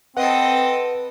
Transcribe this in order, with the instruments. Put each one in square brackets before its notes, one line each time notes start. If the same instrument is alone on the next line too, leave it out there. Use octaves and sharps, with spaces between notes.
[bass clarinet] C4 [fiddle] A4 D#5 [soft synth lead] B4 [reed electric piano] F#5